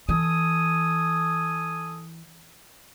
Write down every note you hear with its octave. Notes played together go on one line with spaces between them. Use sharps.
E3 A4 G#5 D#6